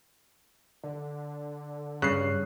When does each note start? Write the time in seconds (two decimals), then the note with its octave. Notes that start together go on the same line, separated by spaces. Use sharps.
0.84 D3
2.02 G2 C#3 F#6 C7